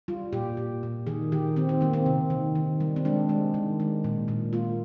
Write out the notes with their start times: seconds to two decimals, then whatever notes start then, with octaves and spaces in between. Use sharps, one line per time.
0.08 G3 F4
0.33 A#2 G4
0.57 A#2
0.83 A#2
1.07 D#3 G#4
1.32 D#3 G4
1.56 D#3 C4
1.69 C4
1.81 D#3 A#3
1.93 C4
2.06 C3
2.30 D#3
2.55 D#3
2.80 G3
2.96 C4
3.05 G#3 D4
3.29 G#3
3.54 D#3
3.80 G#3
4.04 A#2
4.28 A#2
4.53 A#3 F4